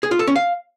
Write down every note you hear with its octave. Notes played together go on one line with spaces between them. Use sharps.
G#4
F4
A4
C#4
F5